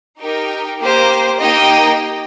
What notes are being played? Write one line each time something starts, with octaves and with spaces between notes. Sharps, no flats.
D#4 G4 A#4 G5
A#3 G4 C5
A#3 D#4 G4 D#5 G5